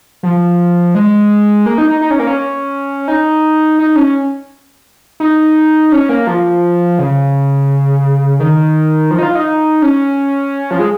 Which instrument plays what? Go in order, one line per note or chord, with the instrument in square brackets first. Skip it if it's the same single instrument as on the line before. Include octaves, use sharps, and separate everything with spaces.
[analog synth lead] F3
G#3
A#3
D#4
D#4
D#4
C#4
A#3
C#4
D#4
D#4
C#4
D#4
C#4
A#3
F3
C#3
D#3
F3
D#4
F4
D#4
C#4
F3
G#3